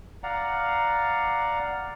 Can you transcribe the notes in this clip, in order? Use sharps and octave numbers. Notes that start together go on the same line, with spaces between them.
D5 F5 F#5 A#5